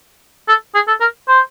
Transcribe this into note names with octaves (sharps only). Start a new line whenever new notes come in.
A4
G#4
A4
A#4
C5